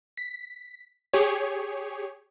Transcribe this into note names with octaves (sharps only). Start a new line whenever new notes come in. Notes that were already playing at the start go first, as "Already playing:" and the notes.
B6
G4 G#4 C#5